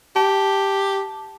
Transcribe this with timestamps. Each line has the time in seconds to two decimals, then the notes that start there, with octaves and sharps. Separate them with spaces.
0.16 G4 A5